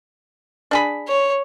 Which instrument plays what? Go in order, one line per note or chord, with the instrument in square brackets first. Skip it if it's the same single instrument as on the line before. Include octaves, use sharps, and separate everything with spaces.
[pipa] D4 G#4 B5
[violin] C#5